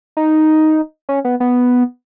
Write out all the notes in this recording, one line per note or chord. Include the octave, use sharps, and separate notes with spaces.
D#4
C#4
B3
B3